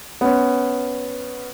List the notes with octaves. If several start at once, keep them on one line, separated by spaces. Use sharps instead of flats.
B3 C#4